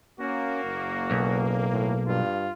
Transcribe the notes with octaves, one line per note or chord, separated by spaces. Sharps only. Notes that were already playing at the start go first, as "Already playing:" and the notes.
A#3 C#4 F#4
F#1
B1
A2
G2 F4